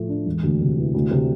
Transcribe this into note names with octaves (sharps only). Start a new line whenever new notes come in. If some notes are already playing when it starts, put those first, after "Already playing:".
Already playing: A2 F3 A3
D4
E1
D2
C3
E3
D2
C3